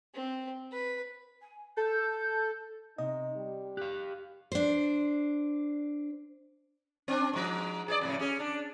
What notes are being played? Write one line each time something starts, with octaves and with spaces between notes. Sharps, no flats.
C4
B4 B5
G#5
A4 G6
C3 D#4 D#5
G3
G4 F5 F#6
D4 C5
C4 D4
G#2 F3
G#4 C#5 D5
F2 A2 C#3
C#4 G#4
D4